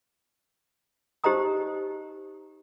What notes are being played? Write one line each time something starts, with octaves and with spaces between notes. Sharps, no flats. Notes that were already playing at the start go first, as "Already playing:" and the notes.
D#4 G4 C5 D#5 A#5 D#6